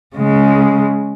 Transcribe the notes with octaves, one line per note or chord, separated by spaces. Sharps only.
C#3 G#3